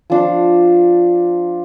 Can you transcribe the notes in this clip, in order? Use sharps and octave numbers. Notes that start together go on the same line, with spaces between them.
F3 D4